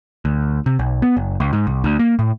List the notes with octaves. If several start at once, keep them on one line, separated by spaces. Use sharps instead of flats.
D2
C3
B1
B3
F#1
C#2
G#2
C2
D2
A#3
A2